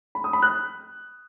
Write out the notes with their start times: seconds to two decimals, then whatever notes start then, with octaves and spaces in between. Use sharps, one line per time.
0.15 B5
0.24 D#6
0.33 B5
0.42 F#6